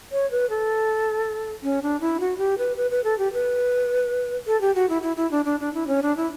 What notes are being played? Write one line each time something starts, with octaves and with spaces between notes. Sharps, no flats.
C#5
B4
A4
C#4
D4
E4
F#4
G4
B4
B4
B4
A4
G4
B4
A4
G4
F#4
E4
E4
E4
D4
D4
D4
E4
C#4
D4
E4